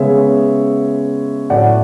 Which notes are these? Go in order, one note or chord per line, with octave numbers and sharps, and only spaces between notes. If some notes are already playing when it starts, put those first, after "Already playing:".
Already playing: C#3 G#3 B3 C#5 E5
A2 F#3 A3 D5 F#5